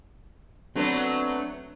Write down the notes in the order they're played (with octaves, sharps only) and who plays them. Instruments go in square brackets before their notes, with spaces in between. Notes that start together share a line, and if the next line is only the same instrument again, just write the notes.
[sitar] F#3 A3 B3 [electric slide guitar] C4 D4 D5